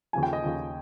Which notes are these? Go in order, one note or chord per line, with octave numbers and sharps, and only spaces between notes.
D#2 C#3 F3 G#5
G5
D#5
D#2 C#3 F3